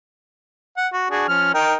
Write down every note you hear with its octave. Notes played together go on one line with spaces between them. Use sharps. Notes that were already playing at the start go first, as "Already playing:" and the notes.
F#5
F#4
D4 F#4 G#4
F3 C#4 F6
D#4 A#4 G5